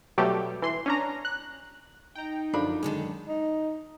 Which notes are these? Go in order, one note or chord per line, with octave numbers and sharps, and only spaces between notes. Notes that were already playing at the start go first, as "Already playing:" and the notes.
B2 F#3 G3 A3 G4
E3 C6
C#4 D4 A#5
F#6
D#4 G5 A#5
F#2 D3 F3 D4 B5
F#2 D3 D#3 G#3
D#4